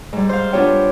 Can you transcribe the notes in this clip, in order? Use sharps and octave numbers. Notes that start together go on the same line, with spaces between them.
G#2 G3
C5 F5
B3 D4 F4 G4 C#5 G5